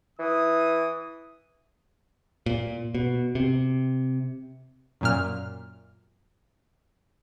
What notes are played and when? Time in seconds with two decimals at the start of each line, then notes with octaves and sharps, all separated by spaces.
0.19 E3 D#6
2.46 A#2
2.95 B2
3.35 C3
5.01 F#2 A#2 F6